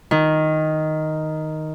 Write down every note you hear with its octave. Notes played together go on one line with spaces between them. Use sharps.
D#3